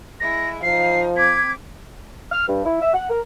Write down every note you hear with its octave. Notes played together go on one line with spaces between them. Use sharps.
G#3 E4 A#6
F3 D#4 F5 C7
C4 D6 G#6 B6
F6
G2
E4
E5
F#5
A#4